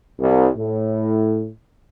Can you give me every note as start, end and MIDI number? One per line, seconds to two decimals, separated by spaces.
0.19 0.47 36
0.56 1.49 45